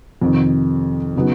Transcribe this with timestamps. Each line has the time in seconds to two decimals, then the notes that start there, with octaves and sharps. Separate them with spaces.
0.21 F2 C3 D#3
1.16 C#3 F#3 B3 D#4